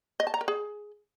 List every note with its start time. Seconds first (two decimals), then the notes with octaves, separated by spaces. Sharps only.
0.20 D#5
0.27 A5
0.34 A#5
0.41 A#4
0.48 G#4